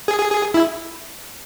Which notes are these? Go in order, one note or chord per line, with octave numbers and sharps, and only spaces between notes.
G#4
G#4
G#4
E4